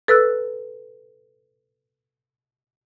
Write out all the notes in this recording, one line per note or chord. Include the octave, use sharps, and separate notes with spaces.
A4 B4 E6 F#6